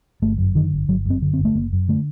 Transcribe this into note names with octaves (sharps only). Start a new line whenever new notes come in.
G1 A3
F#2
D3 D#3
G1
G1 F#3
F#2 C4
D3
C4
G1
A3
F#1 A#3
F#2
D3 A3